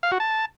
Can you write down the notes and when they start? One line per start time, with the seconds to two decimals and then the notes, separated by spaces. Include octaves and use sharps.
0.03 F5
0.12 F#4
0.20 A5